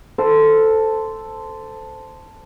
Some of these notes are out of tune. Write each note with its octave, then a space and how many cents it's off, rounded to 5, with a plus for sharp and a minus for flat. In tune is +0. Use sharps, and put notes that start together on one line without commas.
A4 +0 C5 -15